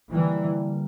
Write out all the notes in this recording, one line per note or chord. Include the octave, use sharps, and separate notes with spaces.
D3 E3 G3 A#3